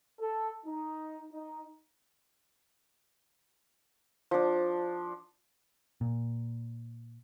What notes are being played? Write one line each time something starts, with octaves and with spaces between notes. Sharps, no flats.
A4
D#4
D#4
F3 D4
A#2